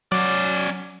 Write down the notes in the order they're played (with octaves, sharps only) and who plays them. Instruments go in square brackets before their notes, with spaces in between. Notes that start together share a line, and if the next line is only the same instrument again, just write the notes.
[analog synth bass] F#3 [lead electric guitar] C#4 D5